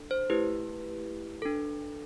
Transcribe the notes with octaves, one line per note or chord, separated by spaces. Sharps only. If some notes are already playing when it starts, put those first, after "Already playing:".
Already playing: D4 A4
C5
A3 E4 G4 B4
D4 A4